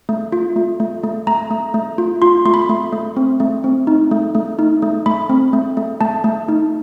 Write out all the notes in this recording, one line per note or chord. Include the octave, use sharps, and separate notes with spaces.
A3
F4
A3
A3
A3
A3 A#5
A3
A3
F4
F4 C6
A3 C6
B5
A3
A3
C4
A3
C4
D#4
A3
A3
D#4
A3
A3 B5
C4
A3
A3
A3 A5
A3
D#4